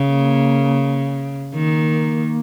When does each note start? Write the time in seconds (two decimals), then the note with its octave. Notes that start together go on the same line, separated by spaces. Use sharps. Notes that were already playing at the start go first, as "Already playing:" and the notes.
Already playing: C#3
0.09 A#3
1.55 D#3 A#3